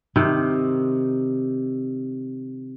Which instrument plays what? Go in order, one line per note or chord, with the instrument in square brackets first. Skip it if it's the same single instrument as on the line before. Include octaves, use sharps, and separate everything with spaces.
[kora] C3 D#3